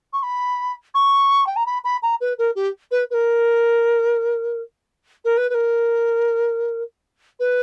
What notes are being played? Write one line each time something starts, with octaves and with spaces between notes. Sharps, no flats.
C#6
B5
C#6
G5
A#5
B5
B5
A#5
B4
A#4
G4
B4
B4
A#4
A#4
B4
B4
A#4
B4